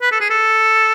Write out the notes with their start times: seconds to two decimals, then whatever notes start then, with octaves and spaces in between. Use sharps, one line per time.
0.02 B4
0.12 A4
0.21 G#4
0.30 A4